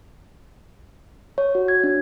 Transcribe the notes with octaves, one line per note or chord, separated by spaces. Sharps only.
C#5
F#4
G#6
D4